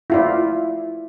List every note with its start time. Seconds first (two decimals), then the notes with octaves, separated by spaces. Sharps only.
0.10 E4 F4 D5